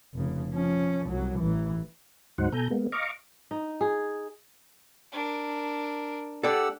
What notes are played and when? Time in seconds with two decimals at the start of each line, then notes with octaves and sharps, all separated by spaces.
0.14 F1 C#3
0.52 F3 C#4
1.07 C2 F#3
1.38 A1 E3
2.38 D2 G#2 F#3 D#4 C5 F#5
2.52 B2 A4 G#5 A#5 G6
2.70 G#3 A#3 B3
2.92 D#5 F5 A#5 C#6 D6
3.51 D#4
3.81 G#4
5.12 D4 A#4
6.43 G4 A4 D5 F#5 E6